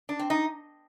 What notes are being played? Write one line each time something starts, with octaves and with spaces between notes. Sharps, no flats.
D4
C4
D#4